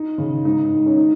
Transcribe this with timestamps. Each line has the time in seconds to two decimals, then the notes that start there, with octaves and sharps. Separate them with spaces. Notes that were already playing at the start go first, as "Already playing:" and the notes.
Already playing: D#4
0.18 C#3
0.45 G#2 D#4
0.72 D#3
0.86 C#4
0.98 D#4